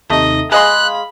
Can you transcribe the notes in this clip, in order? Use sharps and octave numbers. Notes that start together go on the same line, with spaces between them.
D#2 C3 A3 D#4 D#5
G#3 G#4 D#5 F5 G#5 B5 C6 F#6